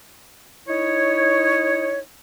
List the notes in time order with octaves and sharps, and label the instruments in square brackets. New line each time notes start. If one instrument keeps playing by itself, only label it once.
[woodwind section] D#4 E4 C#5